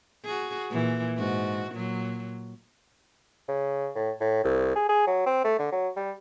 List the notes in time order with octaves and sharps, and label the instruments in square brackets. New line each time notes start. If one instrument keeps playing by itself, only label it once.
[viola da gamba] F#4 G#4
A#2 E3
G#2 F#4
A#2 F#3
[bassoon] C#3
A2
A2
C2
G#4
G#4
F#3
C4
A3
D3
F#3
G3